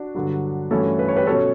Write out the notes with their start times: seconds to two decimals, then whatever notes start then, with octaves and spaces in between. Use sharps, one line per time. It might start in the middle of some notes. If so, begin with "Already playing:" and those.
Already playing: D4 F#4
0.15 G2 D3 F#3
0.70 G2 E3 A3 C#4 F#4 A4
0.99 B4
1.08 C#5
1.16 G4 B4
1.27 B2 F#3 C#4 A4 C#5